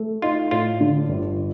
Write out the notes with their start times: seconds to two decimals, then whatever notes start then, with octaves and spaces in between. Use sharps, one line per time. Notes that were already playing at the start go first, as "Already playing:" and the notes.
Already playing: A3
0.22 D#4 F4
0.51 A2 F4
0.81 D3
1.09 G1